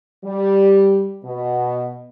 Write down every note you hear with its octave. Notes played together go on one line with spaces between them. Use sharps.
G3
B2